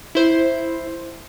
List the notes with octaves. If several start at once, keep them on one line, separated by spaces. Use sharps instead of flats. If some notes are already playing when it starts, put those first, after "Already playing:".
E4 C5